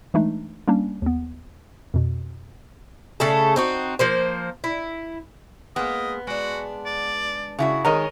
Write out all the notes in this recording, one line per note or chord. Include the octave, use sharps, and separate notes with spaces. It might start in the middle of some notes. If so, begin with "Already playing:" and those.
E3 G#3 A3 D4 D#4
G3 A#3 C#4 D4
D#2 B3
F2 B2
C#3 A3 A4
C4 D#4 F#4
F3 A#3 C5
E4
G#3 A#3 B3 D#5
G#3 D4 F#4
D5
C#3 E4 F#4
D#3 G#3 A#4 C#5 D#5